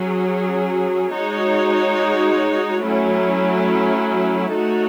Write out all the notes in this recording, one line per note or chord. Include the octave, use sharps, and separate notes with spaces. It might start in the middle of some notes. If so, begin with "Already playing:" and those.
Already playing: F#3 C#4 G#4
G#3 D#4 F#4 C#5
F#3 A3 C#4 E4
A3 D#4 F#4 A4 C#5